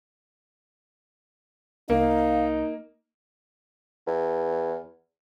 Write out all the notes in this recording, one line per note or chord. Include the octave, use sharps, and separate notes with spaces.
C2 A#3 D#4 F5
E2